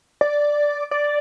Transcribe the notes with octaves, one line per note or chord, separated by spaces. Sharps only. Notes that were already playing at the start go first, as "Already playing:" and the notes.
D5
D5